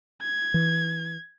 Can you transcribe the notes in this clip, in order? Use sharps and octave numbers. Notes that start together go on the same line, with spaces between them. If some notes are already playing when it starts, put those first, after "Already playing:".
G#6
E3